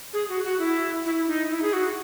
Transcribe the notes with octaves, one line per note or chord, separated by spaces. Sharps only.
G#4
F#4
F#4
E4
E4
D#4
E4
G#4
F#4